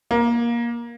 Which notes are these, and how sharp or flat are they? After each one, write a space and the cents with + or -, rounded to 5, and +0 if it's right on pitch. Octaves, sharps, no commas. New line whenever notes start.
A#3 +20